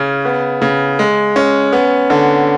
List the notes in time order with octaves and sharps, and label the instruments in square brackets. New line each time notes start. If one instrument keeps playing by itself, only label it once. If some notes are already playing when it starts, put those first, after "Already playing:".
Already playing: [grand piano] C#3 C#4
B3
C#3
G#3
C#4
B3
D3